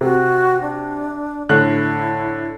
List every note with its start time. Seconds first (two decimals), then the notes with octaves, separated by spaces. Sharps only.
0.01 C3 F#4
0.62 D4
1.49 A2 D3 E4 F#6